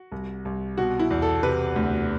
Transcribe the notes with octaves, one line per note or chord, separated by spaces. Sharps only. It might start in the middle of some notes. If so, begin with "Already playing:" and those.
Already playing: F#4
C2
C2
B2 F#4
E4
E2
A4
C3 B4
D2